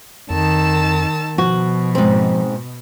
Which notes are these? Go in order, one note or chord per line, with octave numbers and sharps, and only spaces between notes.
F2 D#3 A5 E6
B2 F3 F#4
G#2 C4